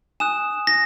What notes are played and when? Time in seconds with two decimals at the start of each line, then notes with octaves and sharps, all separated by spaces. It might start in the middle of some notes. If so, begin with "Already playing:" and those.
0.20 G#5 D#6 F#6 E7
0.67 A#6